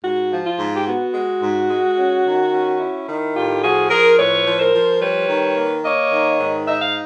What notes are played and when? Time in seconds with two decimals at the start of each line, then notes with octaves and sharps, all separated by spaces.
0.03 G#2 F#4
0.31 F3
0.45 F4
0.59 G#2
0.76 G4
0.86 B3 F#4
1.14 G#3
1.41 G#2
1.69 G#3
1.96 C#4
2.25 D#3
2.53 C#4
2.79 E4
3.08 D#3
3.35 A2 F4 G4
3.63 F3 F#4 G#4
3.90 F3 G#4 A#4
4.18 A2 B4 C#5
4.46 F3
4.59 A#4 C5
4.74 F3
5.01 G3 B4 C#5
5.29 D#3
5.57 A#3
5.84 A#3 C#5 D#5
6.12 D#3
6.39 G#2
6.67 D#4 E5
6.81 F5